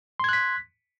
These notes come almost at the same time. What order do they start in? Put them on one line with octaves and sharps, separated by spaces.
C6 G#6 F#6 B6